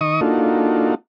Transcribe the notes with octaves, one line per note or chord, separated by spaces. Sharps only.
D#3 D#5 C#6 D#6
A#3 D4 D#4 F4 F#4 A4